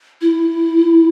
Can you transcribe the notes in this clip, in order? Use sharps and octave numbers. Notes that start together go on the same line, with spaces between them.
E4